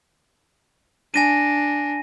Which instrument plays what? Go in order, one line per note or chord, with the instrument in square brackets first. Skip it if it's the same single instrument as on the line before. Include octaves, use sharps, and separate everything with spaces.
[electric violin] D4 [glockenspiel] G#5 A#6 D#7